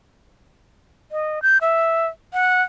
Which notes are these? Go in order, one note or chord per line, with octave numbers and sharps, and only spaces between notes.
D#5
G6
E5
F#5